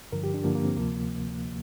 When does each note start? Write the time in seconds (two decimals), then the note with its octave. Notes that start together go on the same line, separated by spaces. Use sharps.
0.12 G2 D3 F3 A#4
0.24 G4
0.34 D4
0.44 G2 D3 F3 A#3
0.55 A#3
0.65 C4
0.76 D2 C3 F3 A#3